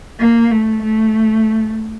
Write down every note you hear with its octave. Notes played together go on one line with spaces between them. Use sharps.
A#3
A3
A3